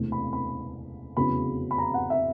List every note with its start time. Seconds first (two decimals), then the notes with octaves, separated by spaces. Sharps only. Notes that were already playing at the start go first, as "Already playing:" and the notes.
Already playing: E1 D2 C3 E3 A3
0.12 B5
0.33 B5
1.16 F1 E2 C#3 F#3 B3 B5
1.71 B5
1.78 A#5
1.94 F#5
2.10 E5